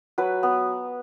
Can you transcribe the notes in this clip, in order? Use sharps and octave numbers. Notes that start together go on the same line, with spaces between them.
F#3 B4
B3